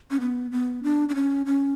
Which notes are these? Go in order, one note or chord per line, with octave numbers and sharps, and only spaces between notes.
C#4
B3
B3
D4
D4
C#4
C#4